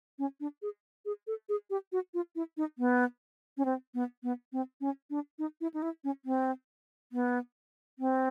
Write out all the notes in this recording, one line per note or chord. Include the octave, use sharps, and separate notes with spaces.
C#4
D4
G#4
G#4
A4
G#4
G4
F#4
F4
E4
D#4
B3
C#4
C4
B3
B3
C4
C#4
D4
D#4
E4
D#4
E4
C#4
C4
B3
C4